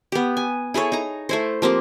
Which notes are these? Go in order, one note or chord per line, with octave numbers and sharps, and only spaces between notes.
B3 G4
G#5
E4 G#4 A4 C#5
D#4 A#5
A3 E4 C5
F3 A#3 C4 G4